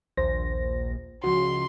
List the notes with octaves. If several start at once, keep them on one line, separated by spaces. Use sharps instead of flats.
A#1 D#2 C5 A#6
C#2 F3 F#4 C6